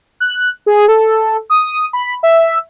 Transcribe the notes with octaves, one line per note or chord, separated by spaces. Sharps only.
F#6
G#4
A4
D#6
B5
E5